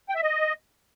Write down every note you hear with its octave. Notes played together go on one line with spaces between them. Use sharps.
G5
E5
D#5